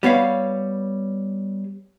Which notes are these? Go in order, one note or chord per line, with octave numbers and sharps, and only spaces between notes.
G3 B3 C#5 F5